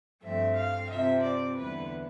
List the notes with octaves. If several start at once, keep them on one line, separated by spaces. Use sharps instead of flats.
G2 F3 A3 C4 E5
F5
C3 F3 C4 E5
D5
E2 D3 G3 B3 E4 B4